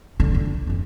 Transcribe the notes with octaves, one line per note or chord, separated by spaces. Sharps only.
D3
F2
D#2 C#4